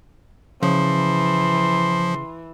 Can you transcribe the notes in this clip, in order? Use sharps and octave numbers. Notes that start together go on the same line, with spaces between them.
C#3 E3 F3 C6